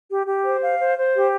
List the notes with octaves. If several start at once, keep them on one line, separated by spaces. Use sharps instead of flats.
G4
G4
C5
F5
C5
C5
G4